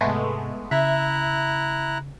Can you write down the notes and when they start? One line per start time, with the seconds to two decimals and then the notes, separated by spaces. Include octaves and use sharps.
0.01 G#2 C3 G#3 A3 B3
0.71 C#3 E4 E5 A#5 F#6